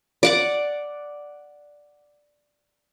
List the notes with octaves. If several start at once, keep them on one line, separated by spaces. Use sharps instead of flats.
D5 F#5 D6